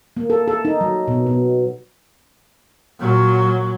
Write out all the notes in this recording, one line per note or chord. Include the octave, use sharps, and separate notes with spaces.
A#3
A4
A4
D#4
F#3
B2
B2
A#2 F#3